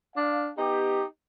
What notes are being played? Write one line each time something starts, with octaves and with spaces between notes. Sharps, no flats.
D4 F5
B3 D#4 G4